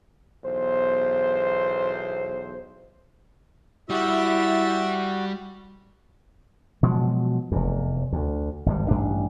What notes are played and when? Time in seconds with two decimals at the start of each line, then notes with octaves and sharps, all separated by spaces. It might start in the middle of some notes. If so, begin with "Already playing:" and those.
0.44 B1 E2 C5
3.90 G3 E4 F#4 E5
6.83 B2 F3 F#3 G#3
7.52 F1 E2
8.13 D2
8.66 G#1 G2 G3
8.88 A1 G2 D4